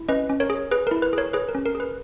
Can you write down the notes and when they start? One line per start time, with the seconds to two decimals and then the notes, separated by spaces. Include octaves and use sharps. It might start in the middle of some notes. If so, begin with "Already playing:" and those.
Already playing: E4
0.09 C#4 B4 D#5
0.29 C#4
0.40 A#4 C#5
0.50 G#4
0.71 G#4 B4
0.87 E4 A#4
1.02 B4
1.13 G#4 A#4 C#5
1.33 G#4 B4
1.49 A#4
1.55 C#4
1.66 A#4
1.75 G#4
1.80 B4